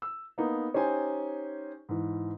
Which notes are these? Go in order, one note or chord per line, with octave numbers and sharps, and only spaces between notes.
E6
A#3 B3 D#4
C#4 D#4 G4 C5 G#5
G#2 E3